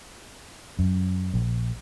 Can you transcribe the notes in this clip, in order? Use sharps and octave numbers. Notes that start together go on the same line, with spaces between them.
F#2
A#1